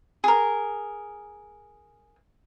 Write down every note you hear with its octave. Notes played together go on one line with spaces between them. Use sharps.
G#4 A#4